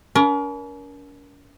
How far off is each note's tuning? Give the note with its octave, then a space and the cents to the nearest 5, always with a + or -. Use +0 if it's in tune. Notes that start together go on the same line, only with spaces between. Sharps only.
C#4 +45 A#4 +25